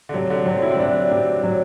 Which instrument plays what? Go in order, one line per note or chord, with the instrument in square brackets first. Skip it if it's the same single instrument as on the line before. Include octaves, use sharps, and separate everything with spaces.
[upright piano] D3
[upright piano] C3 [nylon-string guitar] F#3
[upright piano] D3
[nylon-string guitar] F#3 [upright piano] C4
[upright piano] E4
C4
[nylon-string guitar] F#3 [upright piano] D4
[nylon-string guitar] G4
F#3